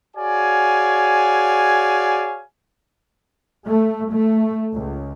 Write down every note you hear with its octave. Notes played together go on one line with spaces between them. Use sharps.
F#4 G#4 C#5 D5 F5 G#5
A3
A3
C#2